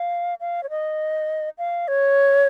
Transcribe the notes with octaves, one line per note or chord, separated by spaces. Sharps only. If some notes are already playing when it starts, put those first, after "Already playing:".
Already playing: F5
F5
C#5
D#5
F5
C#5